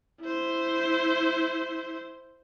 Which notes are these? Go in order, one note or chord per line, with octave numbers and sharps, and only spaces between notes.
E4 C5